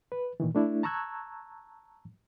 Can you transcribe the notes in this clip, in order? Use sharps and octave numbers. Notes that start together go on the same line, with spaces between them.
B4
A#2 D#3 E3
A3 D4 E4
A5 A#5 C#6 E6 F#6 G#6